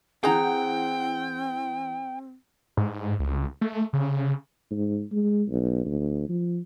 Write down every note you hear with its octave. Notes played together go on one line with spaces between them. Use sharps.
E3 C4 G#4 F#5 G5 A#5 G6
G#2
C#2
A3
C#3
G#2
G#3
B1
D2
F3